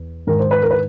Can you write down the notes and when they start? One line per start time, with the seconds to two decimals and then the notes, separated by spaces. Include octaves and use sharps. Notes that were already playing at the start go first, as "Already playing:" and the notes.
Already playing: E2
0.27 G#2 D#3 A#4
0.39 C5
0.51 B4
0.62 A#4
0.71 B4